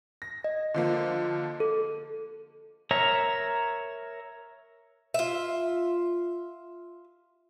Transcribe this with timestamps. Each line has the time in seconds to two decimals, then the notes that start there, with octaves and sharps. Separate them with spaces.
0.22 A#6
0.44 D#5
0.74 D3 F3 A#3
1.60 A4
2.91 A#4 C#5 E5 A#5
5.14 F4 E5